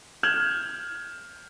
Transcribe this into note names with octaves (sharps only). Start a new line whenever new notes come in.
F6 G6 G#6 E7 F#7